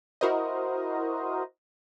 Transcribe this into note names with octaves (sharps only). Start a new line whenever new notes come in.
E4 F#4 A#4 C5 D#5